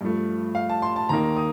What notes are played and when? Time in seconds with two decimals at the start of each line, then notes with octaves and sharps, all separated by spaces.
0.01 G2 F3 A3
0.55 F5
0.69 A5
0.82 C6
0.96 A5
1.09 D#2 D#3 A#3 A#5
1.37 D#6